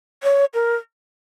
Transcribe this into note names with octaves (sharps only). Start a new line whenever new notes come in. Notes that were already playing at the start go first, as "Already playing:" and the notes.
C#5
A#4